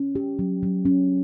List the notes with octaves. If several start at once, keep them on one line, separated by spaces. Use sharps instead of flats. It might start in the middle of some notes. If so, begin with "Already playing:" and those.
Already playing: C#4
G4
F#3
F#3
C#4